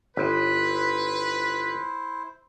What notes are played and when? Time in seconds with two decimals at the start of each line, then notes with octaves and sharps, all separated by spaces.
0.17 G1 E4 B4 C5